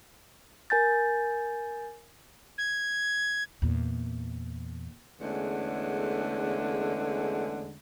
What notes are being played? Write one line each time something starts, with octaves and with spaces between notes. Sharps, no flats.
A#4 G#5 G6 A6
G#6
E2 A#2
E2 D3 G#3 A3 C#4